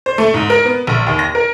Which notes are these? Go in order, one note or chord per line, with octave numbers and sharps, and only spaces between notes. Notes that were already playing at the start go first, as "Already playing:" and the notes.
C5
A3
G#2
A#4
B3
A#1
D#2
A#6
A#4